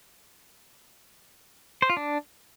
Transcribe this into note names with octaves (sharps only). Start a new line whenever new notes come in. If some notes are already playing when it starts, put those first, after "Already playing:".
C5
F4
D4